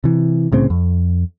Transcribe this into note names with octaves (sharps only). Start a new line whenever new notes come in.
C3 E3
C2 A2 C#3 C4
F2